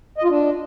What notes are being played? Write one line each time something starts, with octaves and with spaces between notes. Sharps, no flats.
D#5
F4
D4